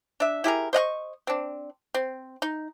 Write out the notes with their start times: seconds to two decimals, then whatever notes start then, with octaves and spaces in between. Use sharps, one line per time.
0.20 D4 E5
0.44 E4 G4 G#4 A#4
0.73 C5 D#5 F5 C#6
1.27 C4 D4
1.94 C4
2.42 D#4